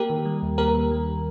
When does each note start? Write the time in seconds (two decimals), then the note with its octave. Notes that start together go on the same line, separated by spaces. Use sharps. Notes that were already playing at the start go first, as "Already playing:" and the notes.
Already playing: A#3 G4 A#4
0.10 D#3
0.25 G3
0.42 D#2
0.58 A#3 G4 A#4
0.74 D#3
0.91 G3